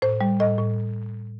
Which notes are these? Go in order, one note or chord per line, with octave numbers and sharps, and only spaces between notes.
A2 C5
G3
A2 D#5
A2